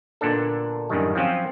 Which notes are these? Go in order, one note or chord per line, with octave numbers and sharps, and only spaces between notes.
A#2 D3 B3 D4 A4
F#2 A2 D3 D#3 G3
F3 F#3 C4 C#4 F4